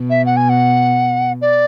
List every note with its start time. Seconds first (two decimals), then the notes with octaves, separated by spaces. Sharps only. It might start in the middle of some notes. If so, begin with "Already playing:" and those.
Already playing: B2
0.10 E5
0.26 F#5
0.37 G#5
0.49 F#5
1.41 D5